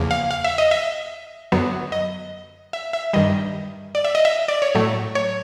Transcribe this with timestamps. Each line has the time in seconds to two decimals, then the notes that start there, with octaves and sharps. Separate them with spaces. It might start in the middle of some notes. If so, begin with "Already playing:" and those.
Already playing: E2 C#3 F3 A#3
0.11 F5
0.31 F5
0.44 E5
0.58 D#5
0.71 E5
1.52 F#2 D3 F#3 B3
1.92 D#5
2.73 E5
2.93 E5
3.13 G2 D#3 G3 D#5
3.95 D5
4.05 E5
4.15 D#5
4.25 E5
4.48 D5
4.62 C#5
4.75 A2 F#3 A3
5.15 C#5